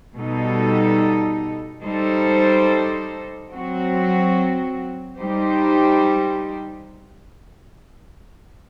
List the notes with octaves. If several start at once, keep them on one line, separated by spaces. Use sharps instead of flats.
B2 G3 D#4 A4
G3 D#4 A4 C5
F#3 C4 F#4
G3 D#4 G4 C5